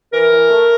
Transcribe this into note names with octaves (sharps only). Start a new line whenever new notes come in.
E3 A#4
E3
A3